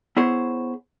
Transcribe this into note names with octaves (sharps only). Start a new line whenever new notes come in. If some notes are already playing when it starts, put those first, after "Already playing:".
B3 E4 G#4 C5 C#5